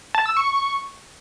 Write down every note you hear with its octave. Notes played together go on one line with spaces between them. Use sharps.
A5
E6
C#6